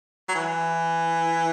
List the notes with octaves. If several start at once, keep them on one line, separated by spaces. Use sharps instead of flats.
F#3
E3